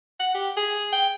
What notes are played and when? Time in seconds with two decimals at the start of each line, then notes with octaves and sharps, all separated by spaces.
0.20 F#5
0.34 G4
0.57 G#4
0.93 G5